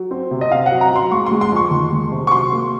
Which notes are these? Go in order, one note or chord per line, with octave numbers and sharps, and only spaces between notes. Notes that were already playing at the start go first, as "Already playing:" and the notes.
Already playing: F#3
C4
C3
D#5
C4 F5
F#5
F#3
A#5
F#3 C6
G#3 C#6
C6
G#3
C6
F2 C#6
D#3
G#3
C3
C#6
F#3 C6
A#3